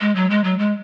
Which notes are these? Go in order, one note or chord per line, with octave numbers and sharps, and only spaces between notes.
G#3
F#3
G#3
F#3
G#3